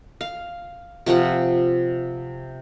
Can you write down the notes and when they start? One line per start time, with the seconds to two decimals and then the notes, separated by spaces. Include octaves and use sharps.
0.21 F5
1.06 C3 F3 F4 F#5